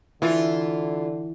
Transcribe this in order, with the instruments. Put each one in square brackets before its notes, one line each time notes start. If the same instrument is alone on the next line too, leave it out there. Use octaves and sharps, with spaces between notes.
[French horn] D3 [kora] E3 [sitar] E4 F4